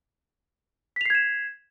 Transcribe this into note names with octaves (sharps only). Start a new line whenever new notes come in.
G#6 B6 C7 E7 F7